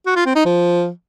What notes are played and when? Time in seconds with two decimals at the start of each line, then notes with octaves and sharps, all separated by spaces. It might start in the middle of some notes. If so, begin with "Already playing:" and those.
0.06 F#4
0.16 F4
0.26 C4
0.36 D#4
0.45 F3